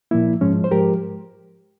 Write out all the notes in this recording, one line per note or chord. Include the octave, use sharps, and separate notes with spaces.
A#2 F3 A#3 E4
G#2 F3 G#3 C#4
C5
G#2 F3 G#3 G4 A#4